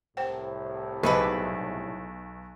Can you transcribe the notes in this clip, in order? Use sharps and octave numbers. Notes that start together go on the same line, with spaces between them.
C2 A2 C5 F#5 G5
B1 G#4 A4 B4 D#5 B5 D6